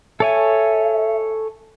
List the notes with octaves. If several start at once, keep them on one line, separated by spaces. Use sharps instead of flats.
A4 C#5 E5 G#5